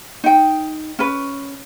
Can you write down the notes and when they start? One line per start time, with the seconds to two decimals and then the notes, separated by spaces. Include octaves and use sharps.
0.24 D#4 G5
0.99 C#4 B4